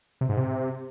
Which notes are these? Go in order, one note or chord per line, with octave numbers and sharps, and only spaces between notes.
C3
G#2
C3